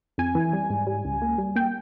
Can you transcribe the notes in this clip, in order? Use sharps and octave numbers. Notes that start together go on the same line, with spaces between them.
F2 G#5
E3
G3
G#2
G3
C#2
A#3
G3
A#3 G5